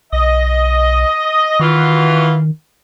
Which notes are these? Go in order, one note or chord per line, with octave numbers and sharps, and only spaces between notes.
B1 D#5
D#3 E3 F4 F#4